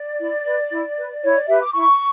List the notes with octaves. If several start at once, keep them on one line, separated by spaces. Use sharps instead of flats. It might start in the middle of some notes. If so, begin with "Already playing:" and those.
Already playing: D5
E4
B4
E4
B4
E4 C#5
D5
G4 B4 E5
D6
E4 C#6